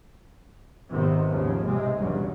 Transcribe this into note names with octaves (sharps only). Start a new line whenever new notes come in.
G#1 G#2 C3 D#3 B3
D#2 G#2 C#3 F3
B1 C3 G#3
B1 E2 G2 C#3 F#3